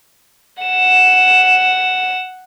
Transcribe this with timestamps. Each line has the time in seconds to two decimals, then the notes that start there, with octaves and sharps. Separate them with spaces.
0.63 F#5 E7